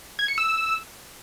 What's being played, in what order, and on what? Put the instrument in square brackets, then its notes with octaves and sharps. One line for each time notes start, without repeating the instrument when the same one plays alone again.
[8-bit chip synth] G#6
C#7
E6